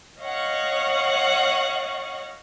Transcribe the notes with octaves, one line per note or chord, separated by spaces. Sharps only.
C#5 D#5 F5 F#5 C#6